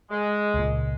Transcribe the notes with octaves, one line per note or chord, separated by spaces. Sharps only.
G#3
C#2 A#2